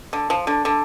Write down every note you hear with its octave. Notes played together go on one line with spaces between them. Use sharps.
D3
F3
D3
D3